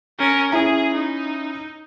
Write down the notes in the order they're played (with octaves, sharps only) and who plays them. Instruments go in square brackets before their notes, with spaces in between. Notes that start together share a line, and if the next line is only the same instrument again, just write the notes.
[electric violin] C#4 A#4
[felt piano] C#4 E4 A#5 [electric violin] G#4
[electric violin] D#4